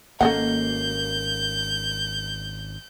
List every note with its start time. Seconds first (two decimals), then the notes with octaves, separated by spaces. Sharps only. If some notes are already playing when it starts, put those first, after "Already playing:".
0.21 G#1 A#3 C#4 F#4 A4 D#5 F#5 G6